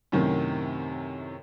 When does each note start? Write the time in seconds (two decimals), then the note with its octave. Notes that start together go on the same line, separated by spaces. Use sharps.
0.12 F#2 A2 C3 D#3